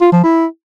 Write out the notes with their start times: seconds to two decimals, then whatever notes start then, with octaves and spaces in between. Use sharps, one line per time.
0.01 F4
0.12 F3
0.23 E4